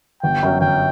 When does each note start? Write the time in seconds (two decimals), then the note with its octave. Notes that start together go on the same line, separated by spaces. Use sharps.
0.22 G1 G5
0.43 F#2 F#3
0.61 G1 G5